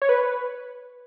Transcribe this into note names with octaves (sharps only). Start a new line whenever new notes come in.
C#5
B4